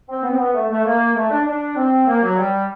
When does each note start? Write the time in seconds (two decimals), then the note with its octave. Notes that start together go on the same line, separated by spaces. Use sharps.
0.09 C4
0.24 B3
0.31 C4
0.38 B3
0.55 A3
0.70 A3
0.85 A#3
1.16 A3
1.31 D4
1.47 D4
1.77 C4
2.07 A#3
2.23 F#3
2.38 G3